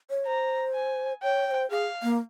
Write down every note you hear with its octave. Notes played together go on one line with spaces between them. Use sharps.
C#5
C5 A#5
G#5
C#5 G5
C#5
C5
G#4 F5
A#3